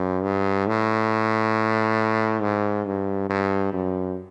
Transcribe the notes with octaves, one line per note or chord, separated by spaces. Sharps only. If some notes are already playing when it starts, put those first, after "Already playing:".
Already playing: F#2
G2
A2
G#2
G2
G2
F#2